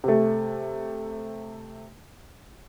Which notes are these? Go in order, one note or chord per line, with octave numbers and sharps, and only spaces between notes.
C3 A3